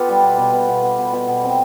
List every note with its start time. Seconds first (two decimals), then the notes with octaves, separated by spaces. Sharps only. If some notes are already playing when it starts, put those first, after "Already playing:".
Already playing: B3 F4 G4 A4 B4
0.09 G3
0.23 B2
0.38 B2
0.53 B2
0.68 B2
0.83 B3
0.99 B2
1.13 B2
1.28 B2
1.44 C4